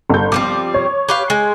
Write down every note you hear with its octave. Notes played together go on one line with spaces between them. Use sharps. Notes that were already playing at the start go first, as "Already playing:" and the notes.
G1 G6
F3 G3 C4 D6
C#5
G4 B4 F5
G#3 G#5